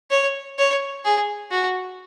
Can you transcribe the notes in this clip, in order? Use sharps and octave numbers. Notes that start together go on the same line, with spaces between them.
C#5
C#5
G#4
F#4